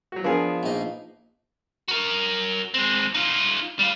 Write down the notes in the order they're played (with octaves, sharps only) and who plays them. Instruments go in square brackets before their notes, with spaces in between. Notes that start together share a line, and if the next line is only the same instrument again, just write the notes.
[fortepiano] F#3 F#4
[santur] F3 [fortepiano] B3 G#4 A#4 [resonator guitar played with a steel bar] D4
[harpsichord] A#1 D#4
[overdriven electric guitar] F#4 A#4
G#3 C4
D#4 F4
G3 F5